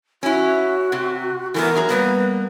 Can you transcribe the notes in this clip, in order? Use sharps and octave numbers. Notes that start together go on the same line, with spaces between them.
C#4 E4 F#4
C3
E3 A3 B3 A#4
F#3 G#4 A#5
G3 A#3 B3 B4